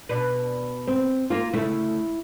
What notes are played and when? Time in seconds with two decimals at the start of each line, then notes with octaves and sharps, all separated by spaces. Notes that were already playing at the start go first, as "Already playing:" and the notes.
0.09 B2 D4 B4
0.87 C4
1.30 A#3 F4
1.53 D2 C#3 A3 E4